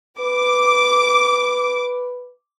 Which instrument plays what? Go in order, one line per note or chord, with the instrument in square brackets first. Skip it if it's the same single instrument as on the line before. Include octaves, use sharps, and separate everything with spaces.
[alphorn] B4 [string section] D6